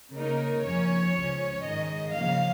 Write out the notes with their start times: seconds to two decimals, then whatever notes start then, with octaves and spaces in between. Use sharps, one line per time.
0.15 C#3 A#3 D#4 A#4
0.64 F2 F3 A#3 C#4 C#5
1.15 C#2 C#3 F3 C#4
1.64 G#2 D#3 G#3 D#5
2.14 C#3 F3 A#3 F5